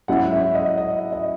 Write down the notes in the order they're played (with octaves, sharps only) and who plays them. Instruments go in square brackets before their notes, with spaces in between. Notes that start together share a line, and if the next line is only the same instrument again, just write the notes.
[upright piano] G#2 F#3 C#4 E4 [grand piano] F#5
[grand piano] E5
D#5
D#5
D#5